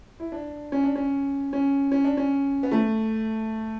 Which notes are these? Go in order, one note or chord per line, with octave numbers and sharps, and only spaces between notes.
E4
D4
C#4
D4
C#4
C#4
C#4
D4
C#4
B3
A3